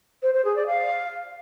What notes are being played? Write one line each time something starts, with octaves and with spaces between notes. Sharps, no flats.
C5
C5
G#4
D5
F5